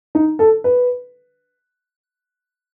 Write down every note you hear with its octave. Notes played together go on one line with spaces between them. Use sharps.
D#4
A4
B4